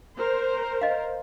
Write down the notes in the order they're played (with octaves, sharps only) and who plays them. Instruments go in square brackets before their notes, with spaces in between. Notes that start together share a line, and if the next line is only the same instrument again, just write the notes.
[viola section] A#4 C5
[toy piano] D#5 F5